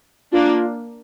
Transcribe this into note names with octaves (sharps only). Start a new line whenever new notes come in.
A#3 D4 F4